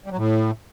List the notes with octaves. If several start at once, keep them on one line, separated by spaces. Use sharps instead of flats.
G3
F#3
A2